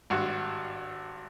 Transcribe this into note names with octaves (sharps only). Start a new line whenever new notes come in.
G#1 G2 F#4